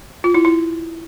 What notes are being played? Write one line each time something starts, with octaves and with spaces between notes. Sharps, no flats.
F4
E4
E4